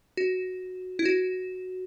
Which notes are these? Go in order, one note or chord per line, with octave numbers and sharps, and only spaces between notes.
F#4
E4
F#4